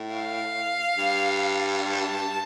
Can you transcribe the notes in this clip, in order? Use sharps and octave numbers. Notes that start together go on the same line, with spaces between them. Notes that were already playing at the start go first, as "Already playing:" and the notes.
Already playing: A2
F5
G2
A5